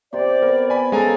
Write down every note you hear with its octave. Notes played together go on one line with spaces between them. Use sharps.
C3 G4 C5 D5
B3 A#4
G#5 B5
C#3 G#3 A4 G#5 A#5